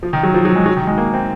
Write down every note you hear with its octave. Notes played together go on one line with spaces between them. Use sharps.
F3
D#3
F#3
F3
F#3
G#3
F#3
D#3
G#3
A#3
C4